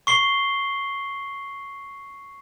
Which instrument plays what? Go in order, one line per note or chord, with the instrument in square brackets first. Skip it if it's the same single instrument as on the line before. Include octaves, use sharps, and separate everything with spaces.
[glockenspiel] C#6 C7 G7